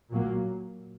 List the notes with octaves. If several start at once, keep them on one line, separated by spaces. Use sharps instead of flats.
A#2 F#3 A#3